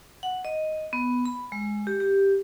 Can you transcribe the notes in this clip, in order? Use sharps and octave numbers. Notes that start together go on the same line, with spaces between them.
F#5
D#5
B3
B5
G#3
G4
G4